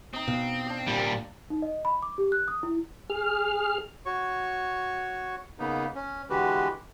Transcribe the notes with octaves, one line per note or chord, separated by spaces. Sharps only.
C4 D#4 D#5
B2 F5
D4 D5
A#2 G3
D#4
D#5
B5
D6
G4
F#6
D#6
E4
G#4 F6
F#4 C#5 C#6
C#3 A#3 B3 D#4
C#4
D3 E3 G#3 F#4 G4 B4